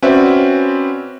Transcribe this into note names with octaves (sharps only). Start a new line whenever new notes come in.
C4 C#4 F#4 B4 D5 E5